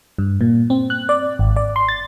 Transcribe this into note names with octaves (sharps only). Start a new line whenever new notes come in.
G2
A#2
C4
F#6
D5
G#1
D5
C6
A6